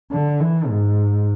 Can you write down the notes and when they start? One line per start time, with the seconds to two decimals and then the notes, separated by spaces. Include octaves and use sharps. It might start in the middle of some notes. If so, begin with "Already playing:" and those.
0.12 D3
0.40 E3
0.68 G#2